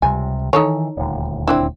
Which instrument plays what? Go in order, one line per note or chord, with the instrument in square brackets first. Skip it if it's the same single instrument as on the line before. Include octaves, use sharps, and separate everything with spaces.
[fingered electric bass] C#2 C3 G3 [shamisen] G#5
[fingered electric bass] D#3 E3 [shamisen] D#4 A4 C#5
[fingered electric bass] D#1 D2
[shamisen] C4 D4 E4